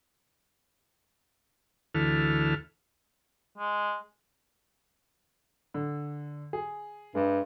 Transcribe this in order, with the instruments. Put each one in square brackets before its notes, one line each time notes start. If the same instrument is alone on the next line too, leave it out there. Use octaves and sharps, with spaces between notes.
[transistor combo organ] D2 E3 A4 F6
[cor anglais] G#3
[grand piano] D3
G#4
[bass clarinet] G2 [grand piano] G#3